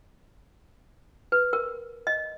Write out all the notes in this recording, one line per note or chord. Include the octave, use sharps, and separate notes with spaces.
B4
A#4
D#5